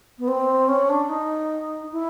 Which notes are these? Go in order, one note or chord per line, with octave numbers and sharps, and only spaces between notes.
B3
C4
C#4
D4
D#4
E4